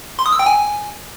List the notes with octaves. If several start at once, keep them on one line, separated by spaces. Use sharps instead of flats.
C6
D#6
E6
G5
G#5